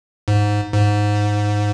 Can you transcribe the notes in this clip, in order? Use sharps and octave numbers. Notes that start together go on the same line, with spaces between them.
G#2
G#2